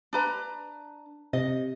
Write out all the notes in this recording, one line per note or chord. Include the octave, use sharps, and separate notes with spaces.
D4 B4 A#5
C3 D#5